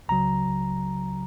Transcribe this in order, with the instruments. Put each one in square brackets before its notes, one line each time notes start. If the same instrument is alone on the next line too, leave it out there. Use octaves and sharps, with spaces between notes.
[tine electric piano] C#2 C#3 F#3 A#5